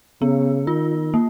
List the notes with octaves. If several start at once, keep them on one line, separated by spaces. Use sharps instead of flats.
C#3 B3
D#3 F4
A#3